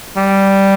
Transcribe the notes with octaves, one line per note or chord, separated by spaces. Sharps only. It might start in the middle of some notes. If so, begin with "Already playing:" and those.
G3